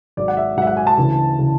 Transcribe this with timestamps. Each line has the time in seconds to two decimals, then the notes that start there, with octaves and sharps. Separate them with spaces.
0.17 G#1 G#2 F#3 D5
0.28 F#5
0.37 E5
0.57 G#1 G#2 F#3 F#5
0.62 E5
0.67 F#5
0.77 G#5
0.87 A5
0.97 D2 C#3 E3
1.39 C#3 E3